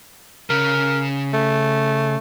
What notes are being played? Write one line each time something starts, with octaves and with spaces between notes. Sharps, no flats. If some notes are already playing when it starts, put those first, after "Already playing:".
C#3 A#4
A3